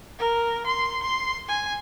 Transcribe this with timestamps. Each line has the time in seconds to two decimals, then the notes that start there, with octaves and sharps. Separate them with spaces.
0.19 A#4
0.66 C6
1.03 C6
1.49 G#5